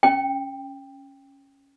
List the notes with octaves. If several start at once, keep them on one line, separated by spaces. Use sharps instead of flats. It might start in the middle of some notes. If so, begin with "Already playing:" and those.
C#4 G5